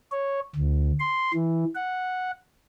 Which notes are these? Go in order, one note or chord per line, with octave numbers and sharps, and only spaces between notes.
C#5
D2
C6
E3
F#5